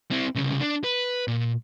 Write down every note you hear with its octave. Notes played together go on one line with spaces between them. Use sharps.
C4 E4
C2 C#3
D4
B4
A#2